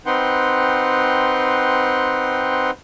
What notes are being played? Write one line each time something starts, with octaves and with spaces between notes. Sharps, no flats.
C4 D#4 B4 F#5 G5 C6